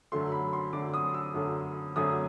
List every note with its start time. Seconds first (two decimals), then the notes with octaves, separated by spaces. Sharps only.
0.12 F#2 D3 F#3 A3 C6
0.32 B5
0.53 C6
0.73 F#2 D3 F#3 A3 D6
0.94 D#6
1.14 E6
1.34 F#2 D3 F#3 A3
1.96 F#2 D3 F#3 A3 D#6